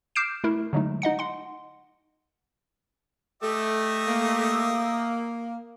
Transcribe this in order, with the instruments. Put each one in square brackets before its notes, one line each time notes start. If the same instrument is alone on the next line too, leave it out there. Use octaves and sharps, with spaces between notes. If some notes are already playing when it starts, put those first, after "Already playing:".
[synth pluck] D6 F6 G6 C7 D7 E7
A3 E4 A#4
D3 F#3 G#3 A3 D#4
D#4 D#5 F#5 C#7
F#5 C6
[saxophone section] A3 [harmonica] G4 D#5 E5
[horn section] A#3